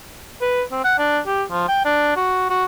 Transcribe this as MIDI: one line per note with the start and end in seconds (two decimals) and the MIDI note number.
0.42 0.62 71
0.72 0.81 60
0.84 0.94 78
0.99 1.19 62
1.27 1.43 67
1.52 1.67 53
1.68 1.81 79
1.85 2.14 62
2.16 2.48 66
2.50 2.64 66